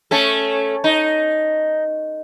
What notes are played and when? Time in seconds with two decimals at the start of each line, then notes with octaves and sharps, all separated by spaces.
0.11 A3 C#4 A4
0.84 D#4